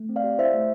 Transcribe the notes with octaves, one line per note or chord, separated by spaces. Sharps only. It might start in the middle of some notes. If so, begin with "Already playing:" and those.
Already playing: A3
C4
D5 F5
G4
E4 C5 E5
A3